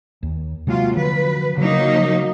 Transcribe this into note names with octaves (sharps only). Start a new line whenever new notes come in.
D#2
C3 F#3 G#3 A#3 F4
D3 F3 F#3 B4
C#3 F#3 A#3 D#4